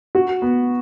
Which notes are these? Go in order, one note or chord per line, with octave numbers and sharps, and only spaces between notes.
F#4
B3